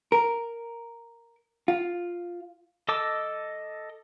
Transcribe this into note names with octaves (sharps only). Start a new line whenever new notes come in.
A#4
F4
A4 D#5 A5 D6 E6